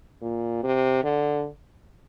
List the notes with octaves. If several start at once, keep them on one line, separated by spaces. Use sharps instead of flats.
A#2
C3
D3